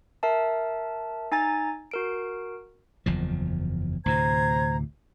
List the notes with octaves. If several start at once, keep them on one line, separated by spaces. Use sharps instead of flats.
A#4 E5 A5
D#4 G#5 A#5 A6
F#4 A#4 D7
F#1 E2 F3
D2 A2 C3 C5 A#5 G#6